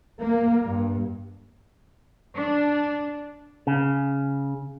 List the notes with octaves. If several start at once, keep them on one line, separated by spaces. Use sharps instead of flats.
A#3
G2
D4
C#3